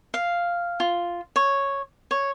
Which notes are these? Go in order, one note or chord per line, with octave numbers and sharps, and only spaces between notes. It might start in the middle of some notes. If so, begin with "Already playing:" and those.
F5
F4
C#5
C#5